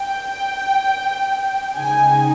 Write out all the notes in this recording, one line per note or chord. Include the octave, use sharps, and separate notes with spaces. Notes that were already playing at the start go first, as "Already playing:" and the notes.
Already playing: G5
C#3 G#3 D#4 G#5